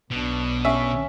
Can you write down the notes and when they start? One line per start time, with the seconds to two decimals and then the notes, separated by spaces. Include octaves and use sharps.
0.11 B1 B2 D4
0.65 C#4 E5